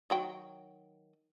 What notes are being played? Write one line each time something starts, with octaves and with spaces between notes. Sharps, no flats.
D#3 F#3 G5